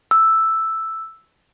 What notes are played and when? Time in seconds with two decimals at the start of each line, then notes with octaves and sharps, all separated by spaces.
0.11 E6